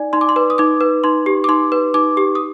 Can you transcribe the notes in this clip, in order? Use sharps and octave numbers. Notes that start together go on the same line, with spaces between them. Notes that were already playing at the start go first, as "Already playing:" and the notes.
Already playing: D#4 D5 G#5
D#4 C6
D6
C6
B4
D#6
D#4 D6
B4
D#4 C6
G4
D6
D#4 C6
B4
D#4 D6
G4
D#6